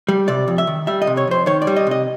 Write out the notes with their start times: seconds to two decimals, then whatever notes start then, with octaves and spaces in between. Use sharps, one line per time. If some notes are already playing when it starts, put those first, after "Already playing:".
0.08 G3
0.28 C3 D5
0.48 F2
0.58 E5
0.67 D#3
0.87 G3 E5
1.02 D#5
1.07 C3
1.17 C#5
1.28 F2 C5
1.46 D#3 C#5
1.62 D5
1.67 G3
1.76 D#5
1.87 C3 D#5